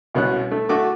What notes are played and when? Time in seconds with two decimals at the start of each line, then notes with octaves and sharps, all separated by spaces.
0.15 C2 B2 C#4 F#6
0.51 A3
0.69 A3 F#4 D6